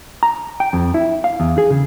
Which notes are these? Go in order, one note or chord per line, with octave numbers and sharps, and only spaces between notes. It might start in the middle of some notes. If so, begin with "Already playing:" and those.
A#5
G5
F2
E4
F5
E2
G#4
C#3